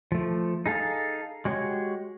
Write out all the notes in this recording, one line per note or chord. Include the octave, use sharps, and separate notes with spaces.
F3 A3
D#4 G#4 A4 F5 A5
G#3 F#4 G4 C#5